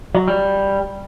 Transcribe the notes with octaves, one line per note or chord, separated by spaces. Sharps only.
F#3
G3